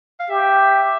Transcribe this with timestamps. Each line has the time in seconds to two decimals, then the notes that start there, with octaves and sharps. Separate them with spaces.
0.20 F5
0.30 G4 E5